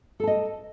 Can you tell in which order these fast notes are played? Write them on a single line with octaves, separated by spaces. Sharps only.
A4 A5 D#5